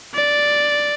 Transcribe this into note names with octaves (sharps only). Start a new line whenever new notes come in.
D5